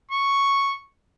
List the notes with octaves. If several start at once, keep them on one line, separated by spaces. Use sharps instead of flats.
C#6